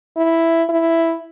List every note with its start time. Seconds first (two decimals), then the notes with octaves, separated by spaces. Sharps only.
0.17 E4
0.69 E4